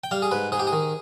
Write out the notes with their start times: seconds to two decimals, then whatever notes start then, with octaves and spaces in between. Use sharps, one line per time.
0.04 G5
0.11 G3 F5
0.22 G#4
0.31 G#2 B4
0.52 G#2 G#4
0.59 G4
0.67 G#4
0.73 D#3